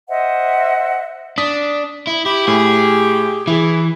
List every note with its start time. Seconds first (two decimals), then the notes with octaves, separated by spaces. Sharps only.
0.09 C5 D#5 E5 F#5
1.38 D4 D#6 B6
2.07 E4
2.26 E4 G4
2.48 A2 G#4
3.47 E3 E4 G#4